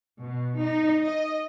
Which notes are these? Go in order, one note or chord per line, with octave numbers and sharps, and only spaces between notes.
B2
D#4
D#5